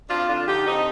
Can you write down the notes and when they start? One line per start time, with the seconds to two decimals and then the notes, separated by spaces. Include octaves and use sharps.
0.08 F2 D4 F4
0.27 D3 D4 F4
0.46 D3 D#4 G4
0.65 D3 C4 D#4